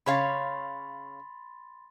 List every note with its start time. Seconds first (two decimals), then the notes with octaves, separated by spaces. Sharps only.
0.06 C#3 C#5 F5 B5 C6 A6